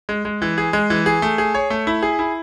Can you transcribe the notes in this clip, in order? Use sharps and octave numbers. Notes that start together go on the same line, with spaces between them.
G#3
G#3
E3
G#4
G#3
E3
G#4
A3
G#4
C#5
A3
E4
G#4
E4